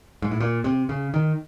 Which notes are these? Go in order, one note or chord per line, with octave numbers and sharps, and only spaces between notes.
G#2
A2
A#2
C3
C#3
D#3